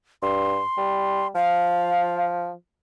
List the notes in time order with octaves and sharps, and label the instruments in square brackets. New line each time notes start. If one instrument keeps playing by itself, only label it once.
[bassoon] G2 [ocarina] C6
[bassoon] G3
[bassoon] F3 [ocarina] F5